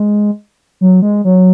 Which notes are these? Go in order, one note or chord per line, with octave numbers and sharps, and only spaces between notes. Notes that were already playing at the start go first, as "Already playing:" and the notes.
Already playing: G#3
F#3
G#3
F#3